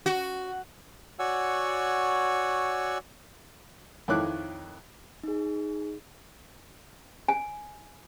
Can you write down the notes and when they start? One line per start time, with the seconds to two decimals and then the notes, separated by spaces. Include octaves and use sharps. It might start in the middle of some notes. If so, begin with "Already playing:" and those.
0.06 F#4
1.19 F#4 C#5 D5 F#5 G#5 E6
4.08 F2 D#3 E4 C#5 D6 F#6
5.24 D#4 G#4
7.28 G#5